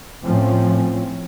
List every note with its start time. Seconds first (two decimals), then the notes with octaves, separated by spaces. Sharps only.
0.24 A2 F3 C4 C#4